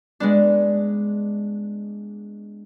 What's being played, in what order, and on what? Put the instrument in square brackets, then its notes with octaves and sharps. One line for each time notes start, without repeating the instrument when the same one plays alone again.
[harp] G#3 B3 D4